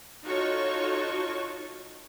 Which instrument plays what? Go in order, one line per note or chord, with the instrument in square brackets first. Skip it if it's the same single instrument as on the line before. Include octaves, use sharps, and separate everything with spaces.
[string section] D#4 F4 F#4 A4 C#5 C#6